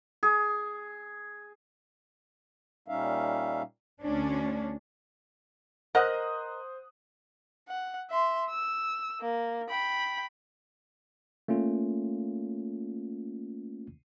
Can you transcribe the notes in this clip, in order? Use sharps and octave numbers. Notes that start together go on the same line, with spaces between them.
G#4
A#2 G3 C#4 D#4 E5 F5
D2 C#4 D4
A#4 C5 D#5 F#5 A#5 D#6 F#6
F#5
E5 C6
E6
A#3
G5 B5
A3 A#3 C#4 F4